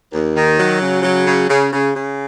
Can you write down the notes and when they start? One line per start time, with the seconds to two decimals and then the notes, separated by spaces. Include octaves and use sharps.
0.12 D#2
0.35 D#3
0.58 F#3
0.80 C#3
1.03 F#3
1.26 C#3
1.49 C#3
1.72 C#3
1.95 C#3